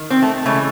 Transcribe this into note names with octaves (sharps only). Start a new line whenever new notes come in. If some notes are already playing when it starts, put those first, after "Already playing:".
Already playing: D#3
C4
A3
C#3 E3 G#3 A3